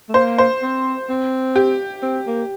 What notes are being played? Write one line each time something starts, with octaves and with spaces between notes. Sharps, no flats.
A3
A#3 C5
C5
C4
C4
G4
C4
A#3